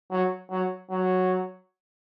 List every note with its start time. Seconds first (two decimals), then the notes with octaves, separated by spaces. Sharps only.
0.11 F#3
0.51 F#3
0.91 F#3